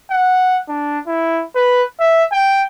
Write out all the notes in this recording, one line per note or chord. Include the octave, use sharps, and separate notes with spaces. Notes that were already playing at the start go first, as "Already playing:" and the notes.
F#5
D4
E4
B4
E5
G5